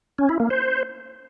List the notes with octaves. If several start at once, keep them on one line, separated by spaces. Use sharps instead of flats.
C#4
E4
A#3
C5